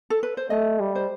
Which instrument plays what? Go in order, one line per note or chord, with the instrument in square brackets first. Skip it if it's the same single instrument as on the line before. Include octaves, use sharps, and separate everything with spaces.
[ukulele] A4
B4
C5
[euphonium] A3 [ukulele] D#5
[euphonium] G3
[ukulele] C5